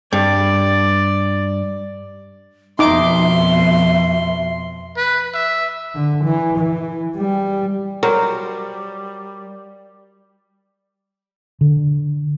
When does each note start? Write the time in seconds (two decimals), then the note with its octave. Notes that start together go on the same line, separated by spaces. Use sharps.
0.13 G2 D5
2.79 F2 B2 F3 D#4 E5 C6 D6
4.97 B4
5.34 E5
5.95 D3
6.24 E3
6.58 E3
7.17 G3
8.03 F#3 G3 A#4 C5
11.61 D3